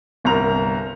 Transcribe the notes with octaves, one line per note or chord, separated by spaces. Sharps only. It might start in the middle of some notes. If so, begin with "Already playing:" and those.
G1 C2 A#4 A#5 F7